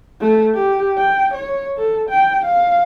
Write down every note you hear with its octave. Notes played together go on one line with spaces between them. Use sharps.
A3
G4
G5
C#5
A4
G5
F5